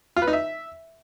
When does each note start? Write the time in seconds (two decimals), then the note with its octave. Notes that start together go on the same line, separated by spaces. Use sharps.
0.16 F4
0.22 B4
0.28 D#4
0.33 E5